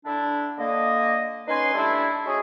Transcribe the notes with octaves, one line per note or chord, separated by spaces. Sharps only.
D3 D4 E4
D3 A#3 D#5
C#4 D#4 B4 G#5 C6
G3 A3 D4 E4
G#3 C#4 F#4 G#4